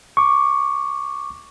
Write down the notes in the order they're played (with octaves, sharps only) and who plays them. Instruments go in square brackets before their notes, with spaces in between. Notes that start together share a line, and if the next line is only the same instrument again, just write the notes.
[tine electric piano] C#6 D6